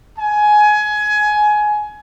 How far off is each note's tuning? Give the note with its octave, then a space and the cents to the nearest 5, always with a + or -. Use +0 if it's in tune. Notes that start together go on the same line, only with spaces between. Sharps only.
G#5 +20